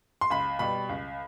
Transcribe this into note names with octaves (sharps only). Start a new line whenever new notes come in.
C6
C#2 B5
B2 G3 B5
C#2